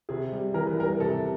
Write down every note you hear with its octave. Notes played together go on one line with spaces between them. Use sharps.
C3 G#4
G3
E3 A#4
B4
G3 A#4
C3 A4